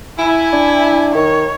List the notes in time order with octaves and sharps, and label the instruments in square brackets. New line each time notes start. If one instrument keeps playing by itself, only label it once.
[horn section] E4 [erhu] G#5
[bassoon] D4
[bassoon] D#3 [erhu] C#5